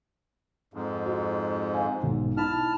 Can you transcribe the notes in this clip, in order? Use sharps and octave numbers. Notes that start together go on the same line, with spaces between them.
F2 G#2
F#4
C5 F5 G#5
B1 G#2
D#4 E4 A5 B5 F6